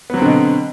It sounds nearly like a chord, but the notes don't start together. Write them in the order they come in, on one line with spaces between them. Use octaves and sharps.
B3 F#3 C4 D3 B2